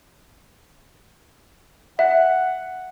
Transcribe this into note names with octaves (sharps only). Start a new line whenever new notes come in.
E5 F#5